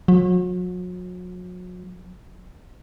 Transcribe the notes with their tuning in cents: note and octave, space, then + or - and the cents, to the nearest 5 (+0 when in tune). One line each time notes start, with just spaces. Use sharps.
F#3 -40